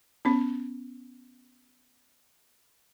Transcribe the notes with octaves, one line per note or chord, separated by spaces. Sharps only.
B3 C#4